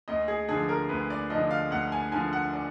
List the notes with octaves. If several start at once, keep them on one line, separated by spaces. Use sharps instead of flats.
D2 D#5
G#4
D3 F3 G#4
A#4
D2 B4
D5
D3 F3 D#5
F5
D2 F#5
G#5
D3 F3 G#5
F#5
D5